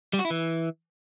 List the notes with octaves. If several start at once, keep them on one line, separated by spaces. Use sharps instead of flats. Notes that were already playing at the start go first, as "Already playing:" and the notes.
G3
F#4
E4
E3